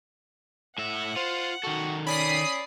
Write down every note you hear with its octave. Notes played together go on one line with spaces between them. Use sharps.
A2 E5 F#5
F4 C5
D#3 F#4 A4
C#4 D5 B5 D#6 C7